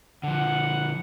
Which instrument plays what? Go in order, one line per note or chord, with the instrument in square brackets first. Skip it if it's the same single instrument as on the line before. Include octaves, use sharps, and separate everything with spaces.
[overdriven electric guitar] D3 F3 [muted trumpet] F#5